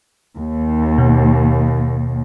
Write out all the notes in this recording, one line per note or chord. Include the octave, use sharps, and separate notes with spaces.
D#2
B2